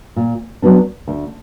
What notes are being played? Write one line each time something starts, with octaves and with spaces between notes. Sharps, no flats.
A#2
F#3 B3 D4
D2